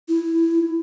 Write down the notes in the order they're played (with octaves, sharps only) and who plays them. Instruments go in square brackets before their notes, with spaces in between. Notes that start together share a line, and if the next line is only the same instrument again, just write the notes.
[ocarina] E4